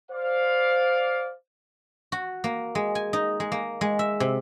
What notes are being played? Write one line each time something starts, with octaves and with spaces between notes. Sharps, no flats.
C5 D5 F5
F#4
A#3
G#3
G#5
D#4
G#3
A#3
G#3
E5
C3